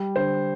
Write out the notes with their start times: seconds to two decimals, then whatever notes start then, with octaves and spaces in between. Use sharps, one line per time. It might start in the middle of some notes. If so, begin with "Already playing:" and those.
Already playing: G3
0.16 D3 C5